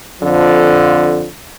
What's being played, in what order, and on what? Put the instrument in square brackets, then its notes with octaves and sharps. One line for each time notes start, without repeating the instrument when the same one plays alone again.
[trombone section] F2 D3 F3